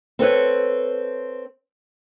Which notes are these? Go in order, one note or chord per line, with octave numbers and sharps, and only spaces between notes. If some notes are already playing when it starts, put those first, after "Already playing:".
C4 A4 B4 C#5